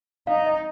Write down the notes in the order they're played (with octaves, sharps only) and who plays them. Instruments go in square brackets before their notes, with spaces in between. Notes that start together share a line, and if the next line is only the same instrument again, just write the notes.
[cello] D#4 [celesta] F5
[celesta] D#5